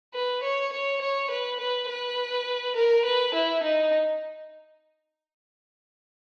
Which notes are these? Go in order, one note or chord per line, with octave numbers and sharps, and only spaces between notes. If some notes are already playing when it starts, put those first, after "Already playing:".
B4
C#5
C#5
C#5
B4
B4
B4
A#4
B4
E4
D#4